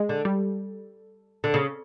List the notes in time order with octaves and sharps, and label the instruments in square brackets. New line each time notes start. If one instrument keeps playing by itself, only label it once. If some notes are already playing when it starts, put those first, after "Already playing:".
Already playing: [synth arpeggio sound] G#3
[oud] D3
[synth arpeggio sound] G3
[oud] D3
C#3